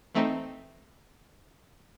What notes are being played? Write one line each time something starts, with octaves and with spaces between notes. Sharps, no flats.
E3 A3 C4 D#4